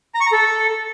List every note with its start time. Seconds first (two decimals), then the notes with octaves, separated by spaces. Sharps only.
0.15 A#5
0.20 C#6
0.26 A#5
0.32 A4